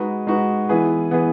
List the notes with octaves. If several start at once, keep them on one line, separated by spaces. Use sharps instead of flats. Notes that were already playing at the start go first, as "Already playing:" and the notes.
Already playing: G#3 D#4 F#4 B4
G#3 D#4 F#4 B4
E3 B3 E4 G#4 B4
E3 B3 E4 G#4 B4